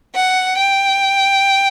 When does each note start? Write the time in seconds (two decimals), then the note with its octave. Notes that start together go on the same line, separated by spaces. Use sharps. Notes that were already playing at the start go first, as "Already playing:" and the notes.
0.15 F#5
0.58 G5